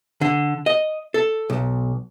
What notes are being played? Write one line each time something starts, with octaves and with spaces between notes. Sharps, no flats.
D3
D#5
A4
B1